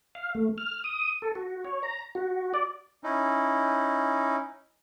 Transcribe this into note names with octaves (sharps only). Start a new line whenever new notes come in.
F5
A3
F6
D#6
A4
F#4
C#5
A#5
F#4
D5
C#4 D#4 E4